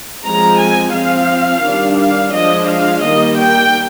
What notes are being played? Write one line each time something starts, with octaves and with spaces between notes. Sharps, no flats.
F3 G#3 C4 A#5
G#5
F3 C4 F5
D#3 G3 D4
F5
F3 G#3 D4 D#5
F5
D#3 G3 A#3 D#5
G5